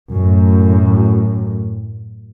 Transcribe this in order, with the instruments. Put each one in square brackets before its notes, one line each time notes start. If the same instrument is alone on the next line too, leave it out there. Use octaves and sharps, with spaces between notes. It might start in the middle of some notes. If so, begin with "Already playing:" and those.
[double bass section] F#2 A2